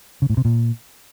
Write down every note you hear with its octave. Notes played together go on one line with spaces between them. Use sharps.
C#3
A2
C3
A#2